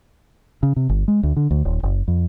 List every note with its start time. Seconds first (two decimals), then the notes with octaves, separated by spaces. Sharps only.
0.63 C#3
0.76 C3
0.89 G1
1.08 G#3
1.23 D2
1.36 D3
1.51 D2
1.65 D#1
1.83 F#1
2.08 F2